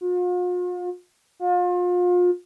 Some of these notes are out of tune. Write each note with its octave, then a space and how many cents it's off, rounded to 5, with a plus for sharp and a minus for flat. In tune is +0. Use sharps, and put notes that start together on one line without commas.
F4 +45
F4 +35